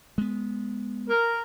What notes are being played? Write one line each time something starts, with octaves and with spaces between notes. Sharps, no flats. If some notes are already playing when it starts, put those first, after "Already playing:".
G#3 B3
A#4